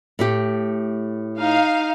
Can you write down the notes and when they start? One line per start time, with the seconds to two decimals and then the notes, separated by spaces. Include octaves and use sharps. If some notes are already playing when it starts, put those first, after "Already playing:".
0.19 A2 A3 G4
1.39 D#4 F5